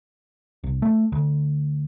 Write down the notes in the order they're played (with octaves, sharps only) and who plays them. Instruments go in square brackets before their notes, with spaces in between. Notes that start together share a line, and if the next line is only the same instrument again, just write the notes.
[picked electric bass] C2
A3
D2